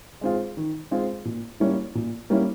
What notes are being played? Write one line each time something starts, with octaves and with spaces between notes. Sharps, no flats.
G#3 C4 F4 G#4
D#3
G#3 C4 F4 G#4
A#2
G3 A#3 C#4 E4
A#2
G3 A#3 C#4 E4